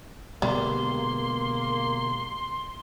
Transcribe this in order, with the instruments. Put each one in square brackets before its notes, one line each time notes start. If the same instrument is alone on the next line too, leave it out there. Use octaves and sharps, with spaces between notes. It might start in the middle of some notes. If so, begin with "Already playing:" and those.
[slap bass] B2 D3 G#3 [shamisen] G3 [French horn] A#3 [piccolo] C6